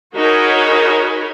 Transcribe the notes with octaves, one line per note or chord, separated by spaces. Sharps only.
D#4 F#4 G#4 A#4 C#5 B5